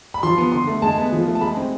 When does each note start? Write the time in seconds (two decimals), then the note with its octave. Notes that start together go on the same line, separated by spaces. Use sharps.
0.14 B5
0.23 F3 C6
0.38 B3
0.52 D3 C6
0.67 A3
0.82 G#3 A5
0.98 B3
1.12 F3
1.27 A3
1.35 A5
1.41 G#3 B5
1.57 C4